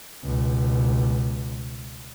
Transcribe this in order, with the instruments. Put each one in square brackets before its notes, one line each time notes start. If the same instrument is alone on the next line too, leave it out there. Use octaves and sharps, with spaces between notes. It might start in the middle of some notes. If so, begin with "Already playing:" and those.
[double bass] C#2 B2